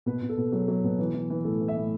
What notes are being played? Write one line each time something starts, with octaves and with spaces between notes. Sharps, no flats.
B2 B4
B2
A4
B2
F#3 G#4
F#3
B2
E3
E3
E3
A2 A4
E3
E5
A2